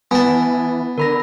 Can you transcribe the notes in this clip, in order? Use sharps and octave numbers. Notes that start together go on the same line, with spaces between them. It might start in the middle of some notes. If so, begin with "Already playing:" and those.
E3 B3 G#5 A5
D3 A#4 B5 A#6